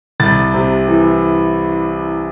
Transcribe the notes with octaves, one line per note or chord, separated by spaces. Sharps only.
C2 A6
C3
E3